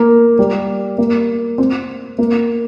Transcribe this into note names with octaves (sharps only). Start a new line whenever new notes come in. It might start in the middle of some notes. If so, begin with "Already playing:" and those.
Already playing: A#3
G3
A#3
C4
A#3